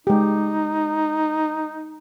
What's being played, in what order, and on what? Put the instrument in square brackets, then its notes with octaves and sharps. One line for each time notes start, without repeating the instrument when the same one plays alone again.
[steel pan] G#3 G4 [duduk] D#4